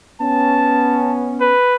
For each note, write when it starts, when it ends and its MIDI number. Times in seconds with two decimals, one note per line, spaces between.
0.21 1.52 59
0.21 1.52 61
0.21 1.13 81
1.40 1.76 71